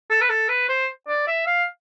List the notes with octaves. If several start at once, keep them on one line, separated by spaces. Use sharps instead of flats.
A4
B4
A4
B4
C5
D5
E5
F5